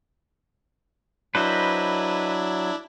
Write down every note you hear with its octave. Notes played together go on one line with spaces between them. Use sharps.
F#3 D4 E4 B4 C5 D#5